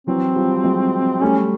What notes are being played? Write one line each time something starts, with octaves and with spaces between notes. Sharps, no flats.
E3 F#3 C4
F3 G3
F#3 G#3
G3 A3 C#4